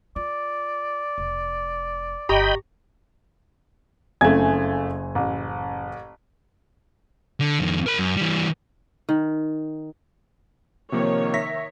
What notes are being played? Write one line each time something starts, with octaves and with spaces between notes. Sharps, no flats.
F4 D5
F1
G1 G4 D#5 G5 A#5 B5 C#6
F#1 F2 A3 G#5 G#6
A1
D3
F2 D#3
A#4 B5
F#2
E3 G3
D#3
C3 D#3 F3 A#3 C#5
E5 A#6 B6